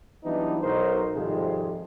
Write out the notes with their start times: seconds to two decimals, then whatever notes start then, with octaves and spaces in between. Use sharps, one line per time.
0.24 E3 F#3 G3 B3 D4 D#4
0.62 B1 F#3 D#4 A#4 C5
1.14 G#1 F2 C3 F3 G3 G#3